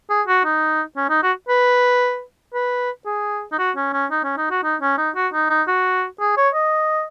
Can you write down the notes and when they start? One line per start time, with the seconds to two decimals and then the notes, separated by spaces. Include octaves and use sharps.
0.10 G#4
0.28 F#4
0.45 D#4
0.97 C#4
1.10 D#4
1.23 F#4
1.49 B4
2.54 B4
3.06 G#4
3.52 D#4
3.59 F#4
3.76 C#4
3.93 C#4
4.11 D#4
4.24 C#4
4.37 D#4
4.51 F#4
4.64 D#4
4.81 C#4
4.98 D#4
5.16 F#4
5.33 D#4
5.50 D#4
5.68 F#4
6.20 G#4
6.37 C#5
6.54 D#5